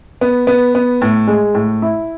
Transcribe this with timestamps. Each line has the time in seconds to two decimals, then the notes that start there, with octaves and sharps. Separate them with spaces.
0.21 B3
0.47 B3
0.75 B3
1.02 A2
1.28 G#3
1.54 A2
1.82 E4